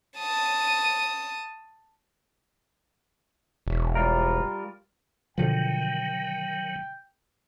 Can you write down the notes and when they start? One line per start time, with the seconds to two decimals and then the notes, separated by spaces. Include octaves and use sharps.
0.18 A5 D#6
3.67 E1
3.95 G3 F4 A#4
5.38 B2 D3 D#3 F3 F#3 G5